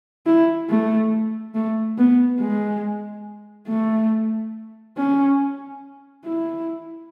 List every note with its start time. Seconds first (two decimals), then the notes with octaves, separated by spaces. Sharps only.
0.26 E4
0.69 A3
1.54 A3
1.98 B3
2.40 G#3
3.68 A3
4.97 C#4
6.25 E4